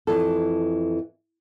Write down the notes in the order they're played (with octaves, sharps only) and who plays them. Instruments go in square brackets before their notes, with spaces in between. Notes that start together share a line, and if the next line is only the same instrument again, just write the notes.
[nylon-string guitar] F2 E3 A4